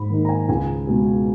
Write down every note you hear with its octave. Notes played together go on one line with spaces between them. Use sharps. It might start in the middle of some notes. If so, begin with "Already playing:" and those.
Already playing: G#2 B5
D#3 A#3 D#4
A#5
G#5
C#2 G#5
B2 G#3